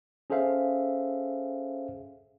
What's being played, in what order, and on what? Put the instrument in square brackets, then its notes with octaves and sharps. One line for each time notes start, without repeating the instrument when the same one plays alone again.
[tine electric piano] C#4 G#4 A4 C5 E5 F5